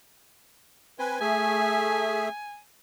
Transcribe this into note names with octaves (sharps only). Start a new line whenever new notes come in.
C4 B4 G#5
A3 G#4 E5 G#5